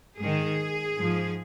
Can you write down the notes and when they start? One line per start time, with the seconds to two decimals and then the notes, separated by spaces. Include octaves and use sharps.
0.17 G#2 D#3 G#4
0.98 G#2 F3